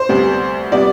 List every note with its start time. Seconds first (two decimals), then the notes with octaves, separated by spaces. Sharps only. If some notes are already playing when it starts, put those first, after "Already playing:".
Already playing: C5
0.09 D2 C3 G3 B3
0.72 C3 G3 B3 D5